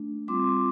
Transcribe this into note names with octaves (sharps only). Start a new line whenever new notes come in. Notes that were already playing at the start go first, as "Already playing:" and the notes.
Already playing: A3 D4
G3 C4 F4 C6 D6